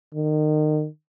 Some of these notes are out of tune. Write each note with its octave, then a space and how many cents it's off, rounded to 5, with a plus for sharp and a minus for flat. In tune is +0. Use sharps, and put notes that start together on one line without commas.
D#3 -30